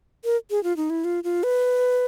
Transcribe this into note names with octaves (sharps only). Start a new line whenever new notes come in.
A#4
G#4
F4
D#4
E4
F4
F4
B4